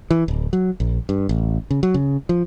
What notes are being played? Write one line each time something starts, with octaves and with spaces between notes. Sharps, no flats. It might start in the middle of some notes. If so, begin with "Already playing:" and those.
E3
D1
F#3
A#1
G2
A1
C#3
F#3
C#3
F3